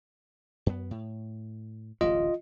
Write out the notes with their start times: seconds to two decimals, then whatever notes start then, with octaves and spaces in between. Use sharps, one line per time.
0.66 F#2 B3
0.91 A2
2.01 D1 A1 G2 F4 D#5